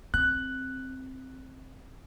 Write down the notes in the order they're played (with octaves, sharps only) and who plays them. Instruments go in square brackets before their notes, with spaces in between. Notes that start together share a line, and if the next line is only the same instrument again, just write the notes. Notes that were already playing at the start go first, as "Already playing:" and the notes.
[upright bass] C4 [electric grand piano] F#6